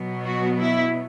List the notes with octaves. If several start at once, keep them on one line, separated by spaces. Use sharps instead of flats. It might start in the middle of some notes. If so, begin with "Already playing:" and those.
Already playing: B2 F#3 B3
F#4
E4